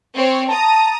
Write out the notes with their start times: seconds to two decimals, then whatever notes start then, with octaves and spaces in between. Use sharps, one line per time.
0.15 C4 C#5
0.48 A5 A#5 D#6